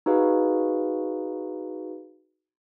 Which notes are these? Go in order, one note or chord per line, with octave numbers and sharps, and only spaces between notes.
D#4 F#4 G#4 B4 F5